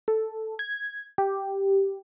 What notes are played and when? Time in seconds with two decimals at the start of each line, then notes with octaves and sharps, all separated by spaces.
0.08 A4
0.59 G#6
1.18 G4